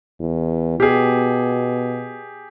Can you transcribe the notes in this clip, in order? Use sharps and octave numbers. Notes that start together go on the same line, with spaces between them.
E2
B2 G4 G#4